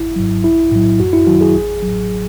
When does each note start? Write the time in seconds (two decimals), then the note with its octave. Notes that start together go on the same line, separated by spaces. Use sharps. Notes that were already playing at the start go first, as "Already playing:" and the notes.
Already playing: G#1 E4
0.16 G#2 F#3
0.44 B1 E4
0.72 A2 F#3
1.00 F#2 F#4
1.13 E4
1.27 D#3 F#3 F#4
1.41 G#4
1.54 A1
1.82 A2 F#3